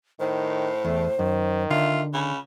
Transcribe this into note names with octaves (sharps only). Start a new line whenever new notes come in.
A2 D#3 C5
E2 A3
F#2 D#3
D3 F4 E5
C#3 B5